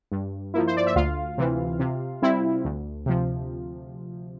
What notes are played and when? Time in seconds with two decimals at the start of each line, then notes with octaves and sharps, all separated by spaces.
0.12 G2
0.54 F3 A#3 E4
0.67 C5
0.77 D5
0.87 E5
0.96 D2 F4 F5
1.38 C3 E3
1.80 C3
2.22 G3 C4 E4
2.64 D2
3.06 C3 F3